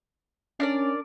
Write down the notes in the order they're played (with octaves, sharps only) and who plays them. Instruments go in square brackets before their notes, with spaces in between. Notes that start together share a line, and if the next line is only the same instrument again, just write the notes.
[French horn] C#4 [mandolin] D4 A#4 D5